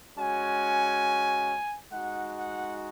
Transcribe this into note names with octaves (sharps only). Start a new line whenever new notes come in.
G#3 C#4 F#4 G#5
G#3 D#4 F#4 F#5
F#5